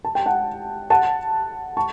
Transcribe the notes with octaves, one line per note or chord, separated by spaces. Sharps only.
A5
G5
F#5 A5
F#5 A5
A5 C#6